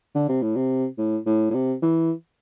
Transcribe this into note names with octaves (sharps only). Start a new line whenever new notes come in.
D3
C3
A2
C3
A2
A2
A2
C3
E3